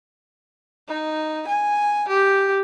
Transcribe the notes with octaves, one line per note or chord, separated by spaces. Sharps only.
D#4
G#5
G4